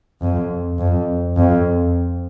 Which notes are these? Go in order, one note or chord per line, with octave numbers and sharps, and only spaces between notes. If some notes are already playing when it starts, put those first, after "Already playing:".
F2
F2
F2